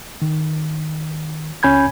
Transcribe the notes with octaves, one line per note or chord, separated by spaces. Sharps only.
D#3
C#2 C#4 G#5 B5 G6 G#6